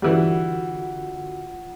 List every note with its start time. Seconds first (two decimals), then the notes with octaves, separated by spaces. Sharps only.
0.02 D3 E3 G3 F4 F#4 F#5